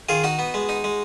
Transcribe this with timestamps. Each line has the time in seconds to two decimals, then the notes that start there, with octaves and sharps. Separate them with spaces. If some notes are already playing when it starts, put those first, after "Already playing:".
0.09 D#3 F4 G#4
0.24 D#4 F#4
0.39 B3
0.54 G#3
0.69 D#4
0.84 G#3